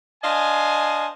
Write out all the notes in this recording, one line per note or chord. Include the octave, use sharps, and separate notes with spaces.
D4 C5 D#5 F5 G#5